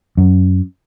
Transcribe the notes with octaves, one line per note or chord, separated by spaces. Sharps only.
F#2